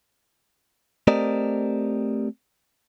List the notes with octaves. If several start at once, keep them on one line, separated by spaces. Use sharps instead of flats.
A3 C4 G4 A#4 D5 D#5